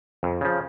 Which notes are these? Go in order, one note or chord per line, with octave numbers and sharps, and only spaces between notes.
F2
C#3 F3